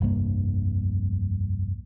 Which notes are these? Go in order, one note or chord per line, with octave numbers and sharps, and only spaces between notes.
F1 C2 G2 A#3